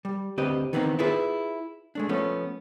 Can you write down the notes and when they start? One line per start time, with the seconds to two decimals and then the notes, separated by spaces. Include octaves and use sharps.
0.05 G3
0.38 D2 C4 G4 B4 D#5
0.73 D#3 E3 B3 C4 D4 D#4
0.99 E4 F4 G#4 B4 E5
1.95 G#3 A3 D4
2.09 F3 A3 B3 C#4